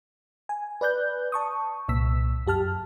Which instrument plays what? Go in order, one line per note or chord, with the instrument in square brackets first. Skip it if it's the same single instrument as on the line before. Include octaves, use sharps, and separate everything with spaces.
[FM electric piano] G#5
B4 D5 F#6 G6
A5 C#6 D#6
C2 A#2 E6 B6
F#2 G4 A5 F6